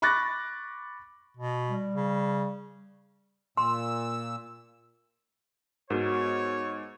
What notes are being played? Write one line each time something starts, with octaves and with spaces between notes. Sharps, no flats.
B5 C#6 D6 F#6 A6 A#6
B2
G3
C#3
A#2 C6 E6
G#2 B3 F#4 A#4 C#5